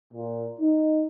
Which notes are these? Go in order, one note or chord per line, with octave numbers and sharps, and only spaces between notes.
A#2
D#4